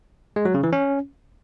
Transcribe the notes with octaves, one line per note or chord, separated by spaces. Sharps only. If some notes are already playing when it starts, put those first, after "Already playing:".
G#3
F#3
C#3
E3
C#4